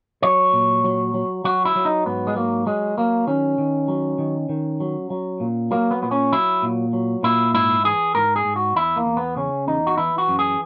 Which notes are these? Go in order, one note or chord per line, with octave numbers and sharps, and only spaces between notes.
F#3 C#5
A#2
F#3
F#3
F#3 F#4
E4
F#3
D#4
G#2 B3
G#3
F#3 A#3
F#3 G#3
F#3 A#3
D#3 C#4
D#3
F#3
D#3
D#3
F#3
F#3
A#2
F#3 A#3
B3
A#2 B3
C#4
F#3 E4
A#2
F#3
A#2 E4
G#2 E4
E3 G#4
G#2 A#4
G#4
G#2
F#4
E2 E4
A#3
E2
B3
C#3 C#4
E2 D#4
F#4
E3 E4
F#4
F#2
G#4